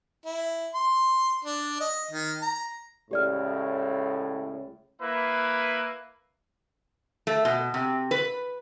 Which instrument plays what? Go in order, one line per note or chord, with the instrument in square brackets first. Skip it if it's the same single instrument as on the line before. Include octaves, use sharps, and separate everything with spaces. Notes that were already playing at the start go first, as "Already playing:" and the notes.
[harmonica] E4
C6
D4
D#5
D#3
A#5
[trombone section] C#2 A2 [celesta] G4 D5 F6
[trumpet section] A#3 E4 B4
[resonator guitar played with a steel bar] A3
B2
C3
B4